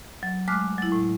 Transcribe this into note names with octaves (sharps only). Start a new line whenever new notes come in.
F#3
G#3 A3 D6 F6 F#6
F#3 E4
A2